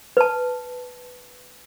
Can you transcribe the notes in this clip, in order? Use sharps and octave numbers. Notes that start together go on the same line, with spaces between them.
B4 A5